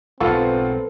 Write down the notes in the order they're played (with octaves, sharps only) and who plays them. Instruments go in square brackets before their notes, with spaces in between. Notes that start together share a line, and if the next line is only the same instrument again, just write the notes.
[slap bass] B1 G#2 [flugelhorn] C4 [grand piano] F4 F#5 C#6 [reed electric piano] A4 B4